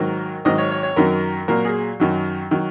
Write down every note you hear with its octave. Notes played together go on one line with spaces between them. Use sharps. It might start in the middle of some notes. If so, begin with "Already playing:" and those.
Already playing: G#2 D#3 F#3 A#4
G#2 D#3 F#3 D#5
C#5
C#5
C#5
F#2 D#3 F#3 A#4
A#2 F#3 A#4
G#4
F#2 D#3 F#3
D#3 F#3